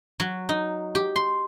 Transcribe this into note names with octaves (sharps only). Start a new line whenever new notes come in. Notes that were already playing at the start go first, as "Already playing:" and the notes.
F#3
D#4
G4
C6